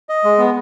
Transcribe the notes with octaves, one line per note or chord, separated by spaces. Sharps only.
D#5
G#3
B3